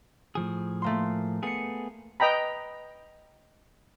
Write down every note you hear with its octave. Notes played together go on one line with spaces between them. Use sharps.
A2 F3 G#4
A3 A#3 C6
A3 B3 G#4 C7 C#7
B4 D#5 G5 A#5 B5